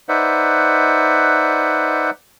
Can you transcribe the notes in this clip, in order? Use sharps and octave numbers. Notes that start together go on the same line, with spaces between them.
D#4 B4 C5 D5 E5 F#5